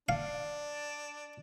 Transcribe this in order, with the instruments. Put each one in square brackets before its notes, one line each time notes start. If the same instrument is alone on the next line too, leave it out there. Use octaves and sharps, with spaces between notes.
[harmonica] D4 [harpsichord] F5